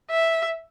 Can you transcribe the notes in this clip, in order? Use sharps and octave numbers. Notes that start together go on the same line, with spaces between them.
E5